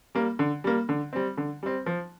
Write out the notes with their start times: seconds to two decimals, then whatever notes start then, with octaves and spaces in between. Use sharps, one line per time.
0.15 G3 A#3
0.39 D3
0.64 G3 A#3
0.89 D3
1.13 G3 C4
1.37 D3
1.63 G3 C4
1.86 F3